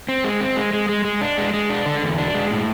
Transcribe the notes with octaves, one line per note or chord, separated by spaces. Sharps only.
C4
G#3
C4
G#3
G#3
G#3
G#3
D4
G#3
G#3
D4
D3
E2
D4
G#3
A2